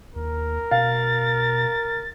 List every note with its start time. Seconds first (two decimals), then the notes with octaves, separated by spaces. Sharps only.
0.16 D#2 A#4
0.71 B2 F5 A6